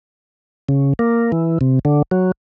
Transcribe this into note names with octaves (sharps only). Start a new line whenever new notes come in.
C#3
A#3
E3
C3
D3
F#3